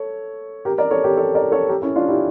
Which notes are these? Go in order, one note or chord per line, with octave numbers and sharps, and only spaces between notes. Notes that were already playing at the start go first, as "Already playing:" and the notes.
Already playing: A4 C#5
G4 A#4
A#4 D5
A4 C#5
G4 A#4
A4 C#5
A#4 D5
A4 C#5
G4 A#4
C#4 E4
D4 F4
E4 G4